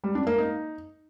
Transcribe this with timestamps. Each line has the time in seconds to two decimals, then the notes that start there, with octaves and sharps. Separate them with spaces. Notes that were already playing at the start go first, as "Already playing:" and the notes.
0.04 G3
0.15 D4
0.27 A#3
0.38 D#4